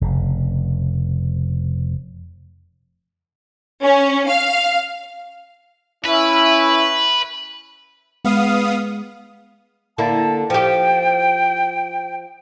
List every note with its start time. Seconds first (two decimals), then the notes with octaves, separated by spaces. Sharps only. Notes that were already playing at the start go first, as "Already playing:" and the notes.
0.01 F1 C#3
3.83 C#4
4.29 F5
6.05 C#4 E4 B4 E5
8.25 G#3 B3 F5 D#6
9.98 D3 A#3 E4 A5
10.50 F3 G4 G5